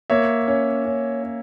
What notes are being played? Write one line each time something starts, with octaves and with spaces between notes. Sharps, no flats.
A#3 C#5 E5
C#4
C#4
C#4